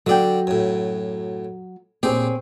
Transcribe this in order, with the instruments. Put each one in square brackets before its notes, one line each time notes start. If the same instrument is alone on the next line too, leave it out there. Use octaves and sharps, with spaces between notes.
[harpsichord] D3 D5 [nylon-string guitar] F#3 G5
[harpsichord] F#2 A2
[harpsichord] A#1 G4 [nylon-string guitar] C4 G#4 C#5